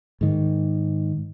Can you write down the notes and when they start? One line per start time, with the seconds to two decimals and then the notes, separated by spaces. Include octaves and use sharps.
0.21 G#2 D#3